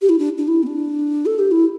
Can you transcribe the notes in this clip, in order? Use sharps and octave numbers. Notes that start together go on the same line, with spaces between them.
G4
E4
D4
D4
E4
B3
D4
A4
G4
E4